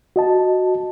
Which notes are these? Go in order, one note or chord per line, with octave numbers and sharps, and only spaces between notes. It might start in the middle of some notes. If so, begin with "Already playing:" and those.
F#4 D#5 A5